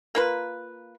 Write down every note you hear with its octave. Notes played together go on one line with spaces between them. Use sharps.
A#3 F4 B4